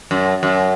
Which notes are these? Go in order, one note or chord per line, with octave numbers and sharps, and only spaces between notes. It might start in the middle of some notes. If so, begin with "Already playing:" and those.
F#2
F#2